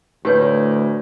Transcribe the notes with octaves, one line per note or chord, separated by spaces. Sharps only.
D2 A2 G4 B4 C#5